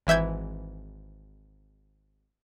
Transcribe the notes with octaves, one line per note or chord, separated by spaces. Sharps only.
G#1 E3 E5 G6 G#6